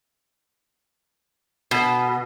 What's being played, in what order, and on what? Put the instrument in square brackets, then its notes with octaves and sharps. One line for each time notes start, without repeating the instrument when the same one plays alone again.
[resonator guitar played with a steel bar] B2